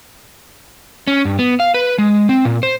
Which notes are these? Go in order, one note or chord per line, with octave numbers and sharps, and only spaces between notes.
C#4
G2
B3
F5
B4
G#3
C4
A#2
C5